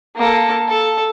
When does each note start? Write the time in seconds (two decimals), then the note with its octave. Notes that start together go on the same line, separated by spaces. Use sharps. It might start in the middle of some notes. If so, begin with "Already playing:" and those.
0.17 A#3 A4
0.68 A4